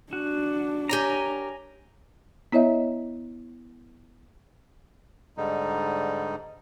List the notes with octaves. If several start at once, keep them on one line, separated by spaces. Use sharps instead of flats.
D4 F#4
G4 A#4 C#5 G#5 A#5
B3 E4 C#5 D#5 E5
G#2 D3 G3 D#4